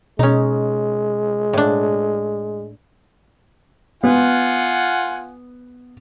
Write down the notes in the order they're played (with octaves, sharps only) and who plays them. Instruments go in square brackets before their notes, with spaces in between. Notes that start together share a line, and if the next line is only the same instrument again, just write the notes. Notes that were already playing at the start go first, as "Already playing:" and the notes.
[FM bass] B2 [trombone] G#3 [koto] C#4 D#4
[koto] A2 D4
[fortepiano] B3 [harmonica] F4 F#5 G#5